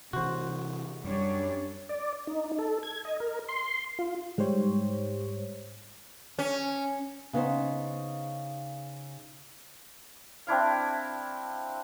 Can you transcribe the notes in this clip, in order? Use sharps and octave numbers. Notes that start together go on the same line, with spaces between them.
C3 E3 F#4 C5
F#2 G3 D4 C#5
D5
D#4
A4
G#6
D#5
A#4
C6
F4
G#2 G3 G4 C5 C#5
C#4
C#3 B3 D#4 C5
C4 D4 E4 F5